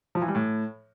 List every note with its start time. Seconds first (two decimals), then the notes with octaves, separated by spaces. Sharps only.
0.15 F3
0.22 E3
0.28 G3
0.35 A2